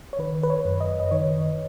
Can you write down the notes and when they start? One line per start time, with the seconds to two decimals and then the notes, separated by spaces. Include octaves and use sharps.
0.13 C#5
0.19 D#3 B4
0.43 B4
0.50 C#5
0.65 F#2
0.81 D#5
1.00 D#5
1.11 D#3 C#5